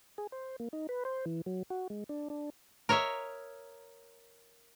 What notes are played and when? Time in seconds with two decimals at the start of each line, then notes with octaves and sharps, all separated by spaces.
0.18 G#4
0.32 C5
0.60 A#3
0.73 D#4
0.89 B4
1.05 C5
1.26 E3
1.46 F#3
1.70 F#4
1.90 G#3
2.09 D4
2.30 D4
2.89 A#4 C#5 D#5 E5